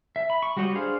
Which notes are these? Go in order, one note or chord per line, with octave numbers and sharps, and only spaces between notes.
E5
B5
C#6
G3 F#4 G4 C#5 D#5
D4 G#4 C5 F5